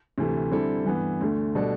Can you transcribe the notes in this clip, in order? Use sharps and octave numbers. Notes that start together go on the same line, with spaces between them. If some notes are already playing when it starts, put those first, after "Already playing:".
D2 C3 E3 A3
D3 G3 C4 E4 A4
G2 E3 B3
D2 D3 A3
B2 G3 D4 A4